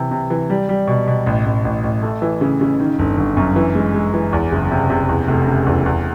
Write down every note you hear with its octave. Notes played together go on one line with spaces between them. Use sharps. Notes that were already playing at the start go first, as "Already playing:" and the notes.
Already playing: C3 E3
C3
E3
G3
G3
B2
B2
A1
A1
A1
A1
A3
E3
C#3
C#3
D#3
G1
G1
F#2
E3
G#3
G#3
E3
E2
F#1
C3
C3
E2
F1
C#3
E2
E2